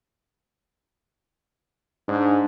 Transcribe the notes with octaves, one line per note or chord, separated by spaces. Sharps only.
G#2 D4